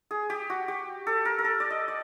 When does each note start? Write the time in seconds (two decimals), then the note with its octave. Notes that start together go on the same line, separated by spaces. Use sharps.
0.11 G#4
0.30 G4
0.50 F#4
0.68 G4
1.07 A4
1.25 A#4
1.39 A#4
1.45 A4
1.60 D5
1.70 D#5
1.88 D5